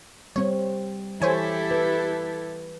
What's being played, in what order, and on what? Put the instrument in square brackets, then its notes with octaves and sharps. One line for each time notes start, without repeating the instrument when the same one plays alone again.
[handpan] G3 C4 [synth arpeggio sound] C#5
[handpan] E3 [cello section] E4 G4 A4 [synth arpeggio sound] C5 C#5 G#5
[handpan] B4